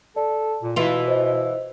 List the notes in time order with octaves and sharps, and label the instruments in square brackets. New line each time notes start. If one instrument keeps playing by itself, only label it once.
[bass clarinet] A4 [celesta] D5
[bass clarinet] A#2
[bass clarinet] B2 [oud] E3 F4 [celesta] F7
[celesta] C5 D#5